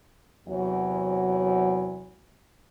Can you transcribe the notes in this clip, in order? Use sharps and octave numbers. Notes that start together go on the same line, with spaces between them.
E2 C3 F#3